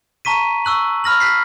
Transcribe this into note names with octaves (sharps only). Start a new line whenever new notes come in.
A5 A#5 C#6 B6 D#7
C#6 E6 F#6 F#7
B5 F6 A#6 F#7
F#6 B6 C7